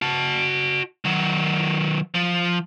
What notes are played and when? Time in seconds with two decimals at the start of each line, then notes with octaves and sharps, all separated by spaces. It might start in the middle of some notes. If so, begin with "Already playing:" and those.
0.02 F#4 A5
1.05 D#3 F#3
2.15 F3